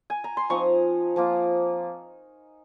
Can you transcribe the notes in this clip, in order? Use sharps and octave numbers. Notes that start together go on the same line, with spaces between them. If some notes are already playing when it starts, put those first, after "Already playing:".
Already playing: F#5
G#5
A#5
C6
F3 C4 D#4 A#5 C#6
F3 A#3 F4